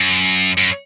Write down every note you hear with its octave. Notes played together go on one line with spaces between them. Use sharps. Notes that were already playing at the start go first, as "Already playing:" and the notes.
Already playing: F#2
F#2